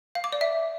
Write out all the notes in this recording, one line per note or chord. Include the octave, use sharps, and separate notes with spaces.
F5
D6
D5
E5